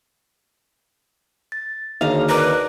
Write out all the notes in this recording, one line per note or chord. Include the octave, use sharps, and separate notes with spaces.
A6
D#2 D3 D#4 F#4 G#4 D#5 F5
A#4 B4 D5